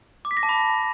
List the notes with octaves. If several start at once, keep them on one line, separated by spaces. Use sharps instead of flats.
D6
B6
A#6
A5
B5